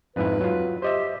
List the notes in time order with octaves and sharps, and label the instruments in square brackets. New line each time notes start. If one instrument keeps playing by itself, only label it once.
[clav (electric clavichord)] F2 G#2 E4 [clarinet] B4
[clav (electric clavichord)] F#3 F4
[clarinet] G4 [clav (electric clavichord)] C5 D#5 E5